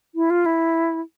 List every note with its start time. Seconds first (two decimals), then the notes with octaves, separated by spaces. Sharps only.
0.15 E4
0.30 F4
0.46 E4